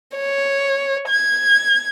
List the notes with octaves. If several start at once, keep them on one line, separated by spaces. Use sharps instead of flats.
C#5
G#6